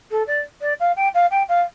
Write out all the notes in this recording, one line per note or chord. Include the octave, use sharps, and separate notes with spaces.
A4
D5
D5
F5
G5
F5
G5
F5